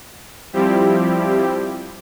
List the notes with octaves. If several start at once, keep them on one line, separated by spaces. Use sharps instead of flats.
F3 G3 C4 E4 G4